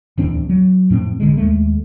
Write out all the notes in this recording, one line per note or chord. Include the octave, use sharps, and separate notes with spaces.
D1 E2 C4 D4
F#3
F2 A2 B3 C4
G#1 D3 G#3
D#2 G#3 A3